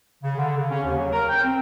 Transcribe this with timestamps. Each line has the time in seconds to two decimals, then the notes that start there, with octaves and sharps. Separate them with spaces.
0.23 C#3
0.37 D3
0.56 C#3
0.71 C#4
0.84 D#2
0.97 F#3
1.11 A#4
1.28 G5
1.42 C4